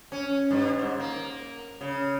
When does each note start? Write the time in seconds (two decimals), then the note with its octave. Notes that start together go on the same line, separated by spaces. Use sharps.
0.12 C#4
0.51 G2
0.79 G#2
1.00 A#3
1.81 C#3